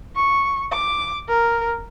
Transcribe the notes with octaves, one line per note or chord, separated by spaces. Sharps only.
C#6
D6
A#4